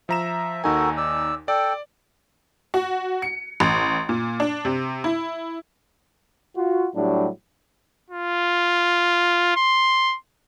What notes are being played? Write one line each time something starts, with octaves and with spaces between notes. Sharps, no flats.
F3 E5 A#5 E7
D#2 D#4 F#4 A4 A#4 G#5
D5 E6
A4 D5 G5
F#4
C#7
A1
A#2
D4
C3
E4
F4 F#4
A2 F#3 G3 D4 E4 G4
F4
C6